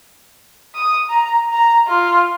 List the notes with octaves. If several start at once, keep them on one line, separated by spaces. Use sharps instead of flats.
D#6
A#5
A#5
F4